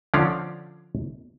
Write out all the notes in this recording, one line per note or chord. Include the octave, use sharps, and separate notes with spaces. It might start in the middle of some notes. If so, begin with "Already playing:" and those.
D3 F3 C#4 D5 F5